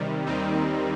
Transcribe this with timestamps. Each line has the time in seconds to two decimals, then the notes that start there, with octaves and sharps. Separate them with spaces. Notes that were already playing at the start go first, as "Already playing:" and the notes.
Already playing: C3 D#3 G3
0.26 D#2 D#3 G3 C4 D#4